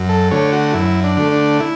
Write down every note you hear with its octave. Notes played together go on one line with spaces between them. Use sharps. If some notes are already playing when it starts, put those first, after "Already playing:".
Already playing: F#2
A4
D3 A3 C#5
F#4
F#2 E4
D4
D3 A3
D4
E4